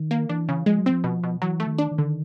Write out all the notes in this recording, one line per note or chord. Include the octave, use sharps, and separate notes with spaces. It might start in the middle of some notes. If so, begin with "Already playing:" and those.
Already playing: D#3
A#3
E3 D4
C#3
F3 G#3
F#3
F3 C4
B2
B2
E3 F#3
A3
D#3
D4
D#3
D3